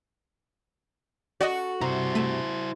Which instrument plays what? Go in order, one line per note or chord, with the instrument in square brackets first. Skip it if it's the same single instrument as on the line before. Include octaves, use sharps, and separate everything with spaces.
[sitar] F#4 [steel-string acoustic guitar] A4 [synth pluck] D5 D#5
[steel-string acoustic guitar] G2 C3 [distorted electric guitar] E4 C5 [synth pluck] A#5
[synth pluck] A3 D#7 E7